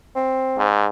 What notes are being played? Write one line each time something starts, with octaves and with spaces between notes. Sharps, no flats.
C4
G#2